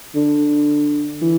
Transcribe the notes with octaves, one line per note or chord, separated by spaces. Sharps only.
D3
E3